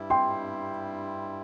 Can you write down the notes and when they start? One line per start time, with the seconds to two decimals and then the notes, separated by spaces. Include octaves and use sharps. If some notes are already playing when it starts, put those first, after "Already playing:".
Already playing: G2 G3 E4
0.10 G5 C6